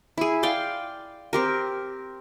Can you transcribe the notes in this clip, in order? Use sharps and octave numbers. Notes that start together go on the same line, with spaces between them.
E4 G#4
D5 F5 G5 C6
C4 G4 A#4